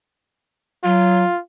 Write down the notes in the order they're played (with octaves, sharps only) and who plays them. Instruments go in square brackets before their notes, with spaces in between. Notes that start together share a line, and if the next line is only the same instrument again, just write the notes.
[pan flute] F#3 [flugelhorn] F4